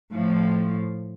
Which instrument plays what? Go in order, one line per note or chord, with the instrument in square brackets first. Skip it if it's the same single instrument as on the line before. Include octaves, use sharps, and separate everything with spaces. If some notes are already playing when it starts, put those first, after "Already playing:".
[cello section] A2 F3